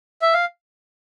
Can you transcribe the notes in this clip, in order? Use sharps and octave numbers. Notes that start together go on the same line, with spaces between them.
E5
F5